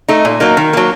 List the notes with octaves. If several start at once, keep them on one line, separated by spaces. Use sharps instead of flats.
A3 D#4
A#2
F#3 A#3 D#4
D#3
F#3 A#3